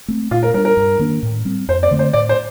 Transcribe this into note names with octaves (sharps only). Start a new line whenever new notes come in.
A3 C4
A#2 F4
A#4
G3 D4 A#4
A#4
G2
D#3 A#3 D4
A2
G3 C4
F2 C5
D5
D3 A3 C4
C5
A2 D5
C5